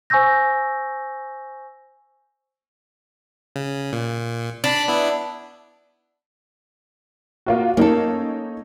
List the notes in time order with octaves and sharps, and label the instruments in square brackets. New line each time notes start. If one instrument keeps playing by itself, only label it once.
[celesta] C5 G#5 C#6 E6 G6 A#6
[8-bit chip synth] C#3
A#2
[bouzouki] D4 [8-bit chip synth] D5 A5 B5
[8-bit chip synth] B3 E4
[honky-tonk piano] A#3 F4 F#4
[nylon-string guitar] A#3 A4 [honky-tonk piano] C#4 D#4 C#5